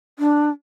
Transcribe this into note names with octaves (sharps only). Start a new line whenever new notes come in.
D4